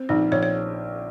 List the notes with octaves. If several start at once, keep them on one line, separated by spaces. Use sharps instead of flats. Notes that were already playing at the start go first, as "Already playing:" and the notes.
Already playing: C4
A#1 D#4
A#1 C#5
C#5